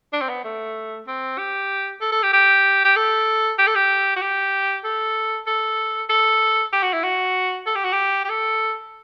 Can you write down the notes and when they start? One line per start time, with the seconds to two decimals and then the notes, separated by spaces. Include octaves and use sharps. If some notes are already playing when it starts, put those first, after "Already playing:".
0.13 D4
0.21 C4
0.29 B3
0.44 A3
1.07 C4
1.38 G4
2.01 A4
2.12 A4
2.23 G4
2.33 G4
2.85 G4
2.96 A4
3.59 G4
3.67 A4
3.75 G4
4.16 F#4
4.22 G4
4.84 A4
5.47 A4
6.10 A4
6.73 G4
6.83 F#4
6.93 E4
7.04 F#4
7.66 A4
7.76 G4
7.84 F#4
7.92 G4
8.25 G4
8.29 A4